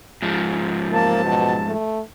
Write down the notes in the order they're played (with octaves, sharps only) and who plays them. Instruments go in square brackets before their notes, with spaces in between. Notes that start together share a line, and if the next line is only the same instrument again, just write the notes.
[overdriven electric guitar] G#2 F3
[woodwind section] C3 F#3 A5 [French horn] A#3
[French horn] B2
A3